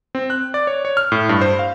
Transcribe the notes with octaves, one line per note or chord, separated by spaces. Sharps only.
C4
F#6
D5
C#5
C#5
F6
A2
G2
C5
F5